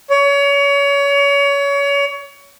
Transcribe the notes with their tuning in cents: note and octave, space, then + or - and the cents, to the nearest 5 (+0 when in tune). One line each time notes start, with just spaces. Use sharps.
C#5 +30